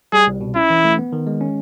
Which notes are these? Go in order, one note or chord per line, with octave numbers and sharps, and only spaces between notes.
G3 G#4
C2
B2
C#4 E4
E3
A3
B3
D#3
G#3
C#4